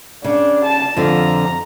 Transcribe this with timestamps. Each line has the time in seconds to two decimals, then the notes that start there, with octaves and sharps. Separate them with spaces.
0.24 C#3 D4
0.65 A5
0.97 F2 D3 F3 A#5